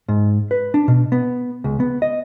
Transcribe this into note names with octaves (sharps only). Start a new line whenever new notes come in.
G#2
B4
D4
B2
B3
C#2
B3
D#5